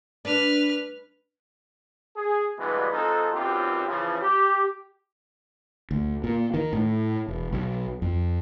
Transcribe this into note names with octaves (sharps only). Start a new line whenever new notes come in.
D4 B4 F6
G#4
D2 G2 B2 E3 G#3 B3
G#3 C4 D#4 F4 A4
B1 F#2 A#2 C4 F4 G4
C#3 E3 F3
G4
D2
A#2
D#3
A2
E1
B1
F2